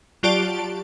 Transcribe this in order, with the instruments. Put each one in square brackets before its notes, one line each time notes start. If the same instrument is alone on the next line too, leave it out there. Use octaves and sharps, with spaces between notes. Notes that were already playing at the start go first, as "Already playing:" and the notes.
[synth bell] F#3 F4 G4 D5 A5 D7